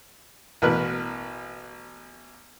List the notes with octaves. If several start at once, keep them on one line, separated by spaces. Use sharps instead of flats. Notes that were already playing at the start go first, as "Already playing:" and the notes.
A1 B2 A#4 B4 F#6